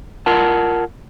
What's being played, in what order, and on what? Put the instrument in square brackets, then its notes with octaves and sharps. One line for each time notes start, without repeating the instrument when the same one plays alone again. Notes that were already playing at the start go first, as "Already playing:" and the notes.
[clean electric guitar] F4 A#4 F#5 A5